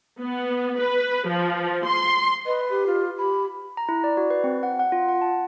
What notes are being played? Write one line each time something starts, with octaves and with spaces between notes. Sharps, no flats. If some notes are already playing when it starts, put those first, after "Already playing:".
B3
B4
F3
C6
B4 D#5
G4
F4
G4 B5
A#5
E4
D5
F#4
B4
C4
F#5
F#5
F4
F#5
A5